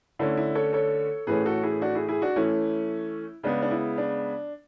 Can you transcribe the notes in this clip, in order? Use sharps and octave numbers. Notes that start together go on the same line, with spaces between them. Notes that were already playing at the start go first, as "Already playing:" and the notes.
D3 A3 C#4 E4
E4
A4 C#5
A4 C#5
A2 E3 A3 C#4 G#4 B4
F#4 A4
E4 G#4
D4 F#4
E4 G#4
E4 G#4
D4 F#4
E3 A3 C#4 E4
C#3 G#3 B3 D4
D4
E4
D4